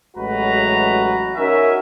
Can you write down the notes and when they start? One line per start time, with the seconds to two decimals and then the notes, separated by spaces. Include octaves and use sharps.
0.17 A1 F#3 G#3 F#4 B4 A#5
1.36 C#4 D#4 F#4 A#4 E5 G#5